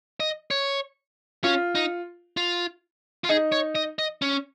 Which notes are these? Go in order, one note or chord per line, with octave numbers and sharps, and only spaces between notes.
D#5
C#5
C#4 F4
D#4
F4
F4
D#4 G#4
C#5
D#5
D#5
C#4